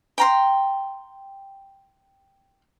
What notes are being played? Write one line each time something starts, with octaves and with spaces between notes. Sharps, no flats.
G5 A#5 C6